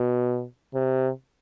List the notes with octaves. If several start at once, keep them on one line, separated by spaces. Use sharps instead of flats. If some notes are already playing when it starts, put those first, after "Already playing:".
Already playing: B2
C3